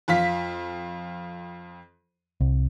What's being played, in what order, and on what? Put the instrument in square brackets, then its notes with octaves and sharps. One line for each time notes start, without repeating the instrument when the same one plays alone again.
[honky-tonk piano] F2 F4 B6
[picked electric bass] C2